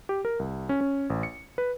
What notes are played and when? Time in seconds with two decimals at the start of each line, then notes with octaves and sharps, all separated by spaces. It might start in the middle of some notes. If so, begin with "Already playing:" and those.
0.09 G4
0.25 A#4
0.39 C2
0.69 C#4
0.81 C#4
1.10 A1
1.23 C#7
1.58 B4